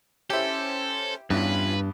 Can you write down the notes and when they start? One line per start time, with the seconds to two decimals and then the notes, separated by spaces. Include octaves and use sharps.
0.30 C#4 E4 G4 A4 C5
1.30 E2 G2 C#4 E4 F4 B4